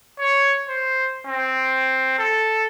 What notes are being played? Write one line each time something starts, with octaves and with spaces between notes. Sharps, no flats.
C#5
C5
C4
A4